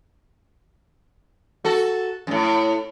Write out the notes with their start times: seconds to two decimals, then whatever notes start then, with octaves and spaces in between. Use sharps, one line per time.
1.65 F#4 A4
2.27 F#2 A2